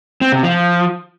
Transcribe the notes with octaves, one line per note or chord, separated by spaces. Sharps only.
C4
C3
F3